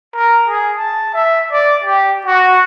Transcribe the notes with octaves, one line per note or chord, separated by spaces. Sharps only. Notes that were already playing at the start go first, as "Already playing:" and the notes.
A#4
G#4
A5
E5
D5
G4
F#4